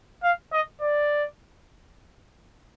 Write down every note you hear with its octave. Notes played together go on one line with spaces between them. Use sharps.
F5
D#5
D5